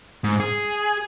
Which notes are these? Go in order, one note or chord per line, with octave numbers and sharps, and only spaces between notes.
G#2
G#4